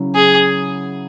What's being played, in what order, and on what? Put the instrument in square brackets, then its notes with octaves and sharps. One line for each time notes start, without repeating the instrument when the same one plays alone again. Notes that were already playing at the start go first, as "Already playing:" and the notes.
Already playing: [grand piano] C#3 F#3 C#4 E4
[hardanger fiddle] G#4